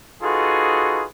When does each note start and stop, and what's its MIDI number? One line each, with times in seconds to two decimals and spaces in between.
0.23 1.05 63
0.23 1.05 65
0.23 1.05 66
0.23 1.05 68
0.23 1.05 69
0.23 1.05 71